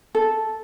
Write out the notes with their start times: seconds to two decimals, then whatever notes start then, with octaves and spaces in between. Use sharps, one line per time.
0.15 A4